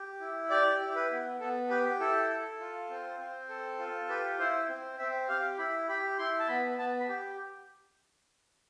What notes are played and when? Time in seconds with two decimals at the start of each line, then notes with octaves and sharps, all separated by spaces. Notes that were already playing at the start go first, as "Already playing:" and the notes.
Already playing: G4
0.20 E4
0.50 G4 D5
0.81 E4
0.95 B4
1.11 B3
1.40 B3 A4
1.70 G4 B4
2.00 E4 A4
2.30 A4
2.60 F4
2.90 C4
3.19 C4
3.49 A4
3.79 F4
4.09 G4 B4
4.39 E4 C5
4.69 C4
4.99 C4 E5
5.29 G4 F5
5.59 E4 B5
5.89 G4 B5
6.18 E4 C6
6.39 A5
6.48 B3 B5
6.78 B3 A5
7.00 B5
7.09 G4